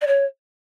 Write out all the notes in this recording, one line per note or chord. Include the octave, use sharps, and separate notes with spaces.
D5
C#5